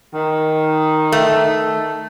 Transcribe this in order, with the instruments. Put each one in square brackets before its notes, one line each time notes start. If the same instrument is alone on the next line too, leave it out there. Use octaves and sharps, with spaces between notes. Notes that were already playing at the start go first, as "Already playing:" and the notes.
[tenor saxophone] D#3
[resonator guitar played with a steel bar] A3